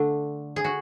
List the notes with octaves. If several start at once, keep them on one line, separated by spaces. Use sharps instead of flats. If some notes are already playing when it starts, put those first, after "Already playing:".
Already playing: D3 A3 D4
G#4
F#4